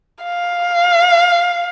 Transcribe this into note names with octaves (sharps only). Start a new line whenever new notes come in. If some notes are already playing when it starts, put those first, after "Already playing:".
F5